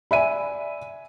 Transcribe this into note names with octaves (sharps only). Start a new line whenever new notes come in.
D5 E5 G#5 B5 D#7